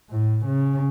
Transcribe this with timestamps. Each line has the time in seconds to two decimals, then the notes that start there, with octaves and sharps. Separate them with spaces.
0.10 A2
0.46 C#3